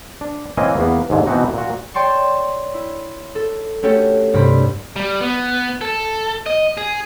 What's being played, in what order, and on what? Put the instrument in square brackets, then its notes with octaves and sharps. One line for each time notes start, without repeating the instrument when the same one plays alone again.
[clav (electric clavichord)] D4
E3 A#3 C4 C#4 D#5 G#5
E2 A#3 B3
D#2 G#2 D3
B2 E3 B3 C4 D#4 F#4
A#2 F#4
[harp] C#5 D5 G5 A5 C6 C#6
E4
A4
A3 C#4 F#4 G4 A4 C#5
C2 G2 C3 C4 B5 B6
[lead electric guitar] G3
B3
A4
D#5
G#4